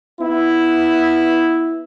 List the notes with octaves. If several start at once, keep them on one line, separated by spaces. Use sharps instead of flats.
B3 E4